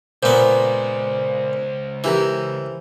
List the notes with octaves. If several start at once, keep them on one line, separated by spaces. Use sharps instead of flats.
C#2 A#2 B3 C5
E3 E4 G4 A#4